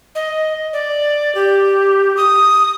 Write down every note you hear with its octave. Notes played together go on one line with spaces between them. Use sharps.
D#5
D5
G4
D#6